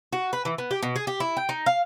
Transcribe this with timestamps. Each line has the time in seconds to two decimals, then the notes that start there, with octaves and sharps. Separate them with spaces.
0.13 F#4
0.33 B4
0.45 E3
0.58 B3
0.71 G4
0.83 B2
0.96 G#4
1.07 G4
1.20 E4
1.37 G5
1.49 D#4
1.66 F5